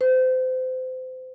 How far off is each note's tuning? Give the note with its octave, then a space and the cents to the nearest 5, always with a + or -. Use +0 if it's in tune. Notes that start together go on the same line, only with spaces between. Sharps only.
C5 -30